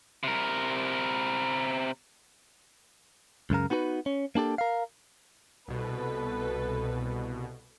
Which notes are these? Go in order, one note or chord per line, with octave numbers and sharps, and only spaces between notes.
C3 A#4
C#2 F#2 C#3 A#4
B3 D#4 F#4 G4 B4
C#4
A#3 D4 G4 A4
A#4 F5
C2 B2 A4 B4